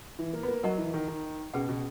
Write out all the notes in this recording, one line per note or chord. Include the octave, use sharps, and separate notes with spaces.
E3
A#3
B3
A#3
F#3 A#4 D#5 F#5 A#5 C#6
E3
D#3
D#3
B2 C#4 G#4 B4 F#5
B2